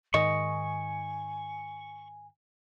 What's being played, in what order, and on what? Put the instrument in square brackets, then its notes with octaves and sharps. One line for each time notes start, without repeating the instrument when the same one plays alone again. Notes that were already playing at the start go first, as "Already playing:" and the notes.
[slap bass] G#2 D#3 [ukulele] D#5 [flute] G#5 [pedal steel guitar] C#6